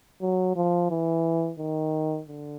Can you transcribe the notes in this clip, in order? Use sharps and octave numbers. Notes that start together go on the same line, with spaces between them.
F#3
F3
E3
D#3
D3